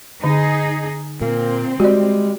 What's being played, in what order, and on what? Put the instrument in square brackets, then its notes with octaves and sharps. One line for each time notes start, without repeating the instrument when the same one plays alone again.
[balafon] D3 [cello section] D#4 G#4
[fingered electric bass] A#2 [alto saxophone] A#3 [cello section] C4
[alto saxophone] G3 [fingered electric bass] G#3 [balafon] F#4 D5